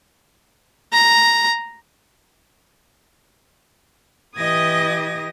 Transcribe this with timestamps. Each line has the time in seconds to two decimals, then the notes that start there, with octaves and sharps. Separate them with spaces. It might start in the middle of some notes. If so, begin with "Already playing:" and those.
0.93 A#5
4.36 E3 G4 D#5 D#6 G#6 A#6